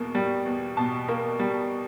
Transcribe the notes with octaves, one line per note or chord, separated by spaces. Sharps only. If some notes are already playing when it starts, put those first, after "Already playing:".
Already playing: E2 B2 A#3
G3
E2
B2 A5
A#3
G3